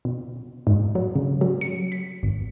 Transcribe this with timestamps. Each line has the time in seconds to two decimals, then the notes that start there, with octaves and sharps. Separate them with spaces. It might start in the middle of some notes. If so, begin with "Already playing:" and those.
0.05 B2
0.67 G#2
0.95 F#3
1.15 C#3
1.41 F#3
1.61 C#7
1.92 B6
2.23 G#1